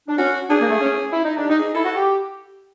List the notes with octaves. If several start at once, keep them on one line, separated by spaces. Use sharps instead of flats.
D4
C#4 F#4
D4 G#4
A#3
A3
C#4
E4
D#4
D4
G4
D#4
G#4
E4 A4
F#4
G4